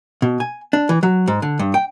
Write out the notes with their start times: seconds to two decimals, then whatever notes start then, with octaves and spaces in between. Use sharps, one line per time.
0.22 B2
0.40 G#5
0.73 D4
0.89 E3
1.03 F#3
1.28 G#2
1.42 D3
1.59 G2
1.74 G5